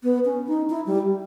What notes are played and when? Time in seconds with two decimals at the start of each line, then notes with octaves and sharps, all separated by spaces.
0.03 B3
0.25 C#4
0.47 D#4
0.70 E4
0.86 G3